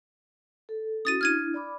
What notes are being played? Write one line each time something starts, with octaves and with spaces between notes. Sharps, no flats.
A4
C#4 E4 F#4 D#6 A6 D#7
D4 E4 F6 G#6 D#7
D5 B5 D6